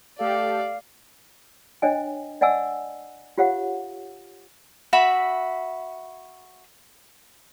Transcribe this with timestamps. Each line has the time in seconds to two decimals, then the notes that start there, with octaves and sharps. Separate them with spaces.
0.19 A3 G4 A4 D5 F5
1.82 D4 C#5 D#5 G5 G#5
2.41 D5 D#5 F#5 G#5 A5 E6
3.38 F4 G4 C#5 F5 F#5
4.93 F#4 E5 B5